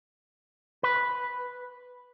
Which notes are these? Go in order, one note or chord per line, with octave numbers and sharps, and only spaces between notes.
B4